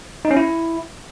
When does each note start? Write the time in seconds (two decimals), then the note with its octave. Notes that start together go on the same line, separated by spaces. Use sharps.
0.25 D#4
0.31 C#4
0.37 E4